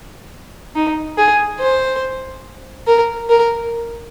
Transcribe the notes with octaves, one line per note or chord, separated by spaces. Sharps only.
D#4
G#4
C5
A#4
A#4